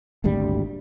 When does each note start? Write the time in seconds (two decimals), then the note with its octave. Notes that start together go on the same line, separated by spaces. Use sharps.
0.24 D#1 G#1 D2 G3